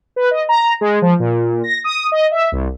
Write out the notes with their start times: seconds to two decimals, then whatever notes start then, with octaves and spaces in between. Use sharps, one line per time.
0.16 B4
0.31 D#5
0.49 A#5
0.81 G#3
1.02 F3
1.19 A#2
1.64 A#6
1.84 D#6
2.12 D#5
2.31 E5
2.52 C2